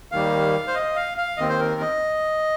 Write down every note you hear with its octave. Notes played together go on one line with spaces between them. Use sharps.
D#2 D#3 G3 A#3 F5
C5
D#5
F5
F5
D#2 D#3 C4 D#5
C5
A#4
D#5